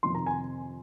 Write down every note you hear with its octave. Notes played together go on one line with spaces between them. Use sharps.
F2 C3 D#3 C6
A#5
G#5